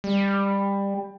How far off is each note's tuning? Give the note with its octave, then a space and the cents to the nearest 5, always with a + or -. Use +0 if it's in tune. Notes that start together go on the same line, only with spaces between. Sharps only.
G3 +20